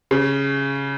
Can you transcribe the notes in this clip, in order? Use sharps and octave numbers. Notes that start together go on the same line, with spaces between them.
C#3